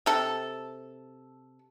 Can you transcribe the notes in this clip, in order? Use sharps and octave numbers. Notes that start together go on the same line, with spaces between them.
C3 A4